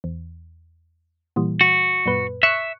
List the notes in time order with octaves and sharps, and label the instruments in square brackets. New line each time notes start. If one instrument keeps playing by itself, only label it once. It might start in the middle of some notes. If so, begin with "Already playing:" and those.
[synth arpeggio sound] E2
A#2 E3 G3
[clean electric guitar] F#4
[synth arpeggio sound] F#2 A#2 B4
[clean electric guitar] E5 [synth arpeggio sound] C#6 F#6 C#7